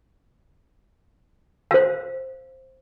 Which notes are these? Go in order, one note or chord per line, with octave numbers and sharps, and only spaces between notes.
C5 F5